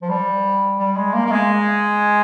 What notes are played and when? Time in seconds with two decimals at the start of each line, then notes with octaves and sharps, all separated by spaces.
0.02 F3
0.09 G3
0.79 G3
0.96 G#3
1.13 A#3
1.26 A#3
1.31 G#3